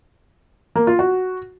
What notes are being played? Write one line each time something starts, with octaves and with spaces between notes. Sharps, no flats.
A#3
F4
F#4